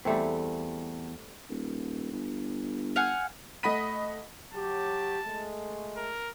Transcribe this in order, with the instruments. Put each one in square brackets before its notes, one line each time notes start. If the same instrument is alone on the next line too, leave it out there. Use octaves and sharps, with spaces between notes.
[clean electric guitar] E2 [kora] G3 A3 C4
[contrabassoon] D#1
G1
[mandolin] F5 F#5 G#5
[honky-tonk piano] A3 D#5 F#5 B5 B6 D#7
[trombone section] F#3 G4 [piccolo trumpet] A5
[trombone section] G#3 A3
[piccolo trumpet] A#4